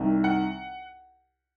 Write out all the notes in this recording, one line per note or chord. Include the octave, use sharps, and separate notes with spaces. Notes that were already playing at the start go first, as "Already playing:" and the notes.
Already playing: C2 C3 D#3
F#5